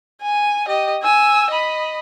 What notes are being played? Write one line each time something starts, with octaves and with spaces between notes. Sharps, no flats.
G#5
G4 D#5
G#5 E6
D#5 B5